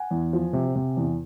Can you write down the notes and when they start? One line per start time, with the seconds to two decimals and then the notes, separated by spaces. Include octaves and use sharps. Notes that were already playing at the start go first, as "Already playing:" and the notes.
Already playing: F#5 G#5
0.11 E2
0.33 F3
0.53 C3
0.75 C3
0.97 E2